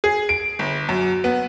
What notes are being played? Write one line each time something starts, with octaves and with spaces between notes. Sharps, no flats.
G#4
D7
G1
F#2
B3